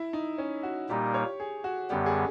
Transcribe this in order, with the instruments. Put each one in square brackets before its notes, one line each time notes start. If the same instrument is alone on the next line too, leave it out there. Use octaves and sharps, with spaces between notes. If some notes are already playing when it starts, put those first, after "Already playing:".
Already playing: [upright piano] E4
D#4
C#4
F#4
[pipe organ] A#2 G3 A#3 D#4 [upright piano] G4
[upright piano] C#5
G#4
F#4
[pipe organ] F#2 D3 G3 B3 [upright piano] G4
[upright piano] G#4